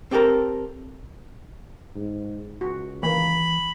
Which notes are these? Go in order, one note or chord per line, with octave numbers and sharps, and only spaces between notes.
C4 G4 A4 A#4 A#5
G#2
C#2 F#4
D#3 E3 A#3 B5